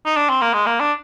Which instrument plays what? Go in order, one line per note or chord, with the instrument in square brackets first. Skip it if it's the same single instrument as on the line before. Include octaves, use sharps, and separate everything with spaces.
[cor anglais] D#4
D4
C4
A#3
G#3
A#3
D4